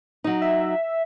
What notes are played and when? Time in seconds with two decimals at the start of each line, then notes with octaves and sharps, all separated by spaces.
0.24 F#3 D#4
0.41 E5